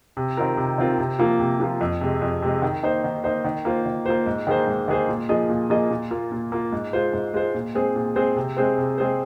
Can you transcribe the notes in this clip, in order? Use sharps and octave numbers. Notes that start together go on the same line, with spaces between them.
C3
D#3 C4 F4 A#4
C3
D#3 C4 F4 A#4
C3
F3 A#3 F4
C3
F3 A#3 F4
F2
C3 G#3
F2
C3 G#3
D#3
A#3 D#4 C5
D#3
A#3 D#4 C5
D#3
A#3 F4 C5
D#3
A#3 F4 C5
G#2
D#3 A#3 G#4 C5
G#2
D#3 A#3 G#4 C5
A#2
F3 A#3 G#4 D#5
A#2
F3 A#3 G#4 D#5
A#2
A#3 F4
A#2
A#3 F4
G#2
G#3 F4 C5
G#2
G#3 F4 C5
A#2
G#3 C4 G#4 C5
A#2
G#3 C4 G#4 C5
C3
G#3 C4 G#4 C5
C3
G#3 C4 G#4 C5